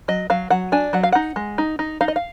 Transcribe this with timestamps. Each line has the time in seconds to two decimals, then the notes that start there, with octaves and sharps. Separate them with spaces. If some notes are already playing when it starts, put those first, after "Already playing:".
0.08 F#3 D#5
0.30 F#3 F5
0.50 F#3 F#5
0.72 D4 G#5
0.93 F#3 F#5
1.03 F5
1.12 D#4 F#5
1.36 G#3
1.58 D#4
1.79 D#4
2.01 D#4 F5
2.08 D#5
2.16 F5